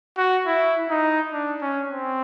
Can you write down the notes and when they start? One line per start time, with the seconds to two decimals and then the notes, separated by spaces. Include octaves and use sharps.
0.18 F#4
0.47 E4
0.90 D#4
1.33 D4
1.62 C#4
1.89 C4